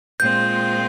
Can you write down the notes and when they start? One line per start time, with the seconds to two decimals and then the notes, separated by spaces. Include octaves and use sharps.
0.20 A#2 G#3 C4 F4 G6